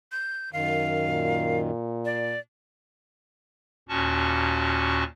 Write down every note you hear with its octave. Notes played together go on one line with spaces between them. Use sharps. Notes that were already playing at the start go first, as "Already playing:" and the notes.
G6
F#2 D#3 F5
A#2
D5
D#2 A#2 C#4 F#4 A5 C#6